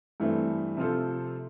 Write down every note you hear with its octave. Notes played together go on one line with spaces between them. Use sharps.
G2 E3 A3 C4
C3 F3 C4 F4 A4